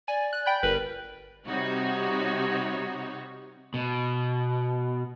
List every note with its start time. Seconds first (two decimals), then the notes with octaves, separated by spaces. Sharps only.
0.08 D5 G#5
0.33 F#6
0.46 G5 B5 G6
0.63 G1 A#4 B4
1.47 C3 G3 D#4 F#4 C#5
3.74 B2